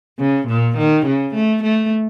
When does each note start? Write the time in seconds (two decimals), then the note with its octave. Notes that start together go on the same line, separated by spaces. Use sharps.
0.19 C#3
0.48 A#2
0.78 D#3
1.06 C#3
1.35 A3
1.63 A3